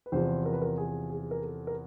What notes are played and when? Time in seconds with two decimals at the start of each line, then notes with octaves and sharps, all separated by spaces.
0.06 B4
0.12 E2 C3 F3 C5
0.46 A#4
0.53 B4
0.62 A#4
0.78 G#4
1.10 G#4
1.31 A#4
1.42 A4
1.67 A#4